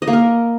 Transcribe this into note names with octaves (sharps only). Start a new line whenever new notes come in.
D#5
A#3
A#4